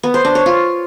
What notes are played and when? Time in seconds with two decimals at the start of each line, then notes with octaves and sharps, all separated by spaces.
0.03 B3
0.14 C5
0.25 D4
0.35 C#5
0.46 F4